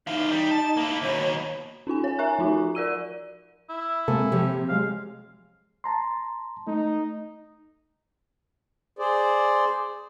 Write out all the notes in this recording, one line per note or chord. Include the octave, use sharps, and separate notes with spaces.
E3 D#4 F5
G3
A5
A#3 E4
D#2 B2 C#5
C#4 D#4 F4 G#5
C#5 G#5
A#4 E5 G#5 A#5 C#6 F#6
F3 D#4 F4 F#4
A#4 D5 E6 D#7
E4
C3 G#3 A#3 A4 G#5
C3 F3 G4 C#5
F#3 G#3 F5
A5 A#5 C6
A3 D#4
G#4 C5 D5